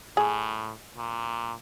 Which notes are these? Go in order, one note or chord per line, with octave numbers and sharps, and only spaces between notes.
A2 G#4
A#2